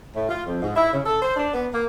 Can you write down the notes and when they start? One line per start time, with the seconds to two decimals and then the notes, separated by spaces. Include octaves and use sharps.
0.15 A2
0.29 F4
0.46 F2
0.62 G#2
0.76 E4
0.93 C#3
1.06 A4
1.22 C5
1.36 D4
1.53 B3
1.73 A#3